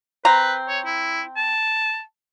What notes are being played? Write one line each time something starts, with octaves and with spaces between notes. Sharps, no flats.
C4 B4 A#5
C#5
E4
A5